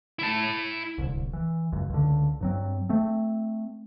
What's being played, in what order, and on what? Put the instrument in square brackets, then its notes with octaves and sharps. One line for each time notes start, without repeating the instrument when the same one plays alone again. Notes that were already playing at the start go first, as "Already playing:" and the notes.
[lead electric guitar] E4 A5
[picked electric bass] D1 C2
E3
C#2 F#2
C#2 D3
G2 F#3 C4
A3 C4